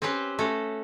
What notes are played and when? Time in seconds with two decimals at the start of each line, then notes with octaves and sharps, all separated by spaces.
0.02 C4 C#4 G4 B4 C5
0.39 A3 C#4 F#4 A4